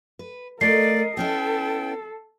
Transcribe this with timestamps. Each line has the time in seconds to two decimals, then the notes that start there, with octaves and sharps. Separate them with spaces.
0.19 B4
0.61 A3 F4 A#4 D5 D#5 C7
1.17 B3 C#4 E4 A4 G5